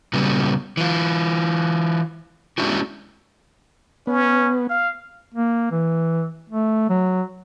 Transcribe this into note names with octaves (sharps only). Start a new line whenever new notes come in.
A#2 C#3 F#3 G3 B3
E3 F4
G#3 C#4 D4 E4 F#4 G4
B3 C#4
F5
A#3
E3
A3
F#3